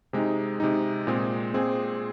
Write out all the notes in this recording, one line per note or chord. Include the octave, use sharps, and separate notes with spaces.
C3 G#3 D#4
C3 G#3 D#4
A#2 G#3 C4 G#4
A#2 G#3 C4 G#4